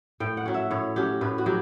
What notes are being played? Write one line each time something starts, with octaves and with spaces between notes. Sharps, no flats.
A2 G5
F#5
F#3 C#4
E5
A2 C#5
F#3 C#4 G4
A2 B4
F#4
F#3 G4